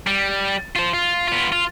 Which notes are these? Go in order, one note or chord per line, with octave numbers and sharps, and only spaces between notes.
G3
F4 C5
F4
B3 F4
F4